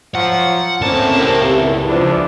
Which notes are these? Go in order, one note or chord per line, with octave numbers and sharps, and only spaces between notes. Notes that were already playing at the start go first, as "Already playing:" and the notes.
F3 F#3 F#5
C#2 A2 A#3 C4 C#4 D5 A5
C4 G4 A#4
E2 E4
E2 F3 D4